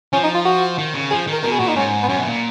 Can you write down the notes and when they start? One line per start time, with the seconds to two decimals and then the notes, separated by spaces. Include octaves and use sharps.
0.12 F3 C#4
0.23 D#4
0.35 F4
0.45 F#4
0.78 D#3
0.94 C#3
1.11 F3 G#4
1.27 D#3
1.33 A#4
1.43 B2 A#4
1.51 G#4
1.60 A#2 F#4
1.68 D#4
1.76 G#2 C#4
2.03 B3
2.08 F#2 C#4
2.18 B2
2.25 A#2